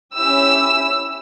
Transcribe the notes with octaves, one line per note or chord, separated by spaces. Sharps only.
C#4 E4 G4 E6